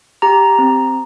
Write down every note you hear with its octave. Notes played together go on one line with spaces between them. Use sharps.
G4 A#5
C4